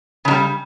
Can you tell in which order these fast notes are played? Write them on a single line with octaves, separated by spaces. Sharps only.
C#3 A2 G3